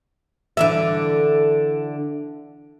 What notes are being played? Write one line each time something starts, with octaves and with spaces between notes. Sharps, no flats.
D3 E3 E5